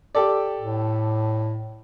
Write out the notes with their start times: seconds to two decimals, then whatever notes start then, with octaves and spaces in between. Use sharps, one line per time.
0.15 G4 A4 D5
0.60 A2